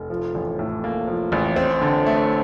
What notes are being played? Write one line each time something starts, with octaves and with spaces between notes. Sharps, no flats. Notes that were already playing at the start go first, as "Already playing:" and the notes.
Already playing: F1
F3
A1
A2
A#3
F3
A1
C4
D3
A3